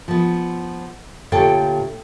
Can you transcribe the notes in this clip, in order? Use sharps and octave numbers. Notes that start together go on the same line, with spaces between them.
F3 B3
D2 A#2 G4 A4 C#5 G5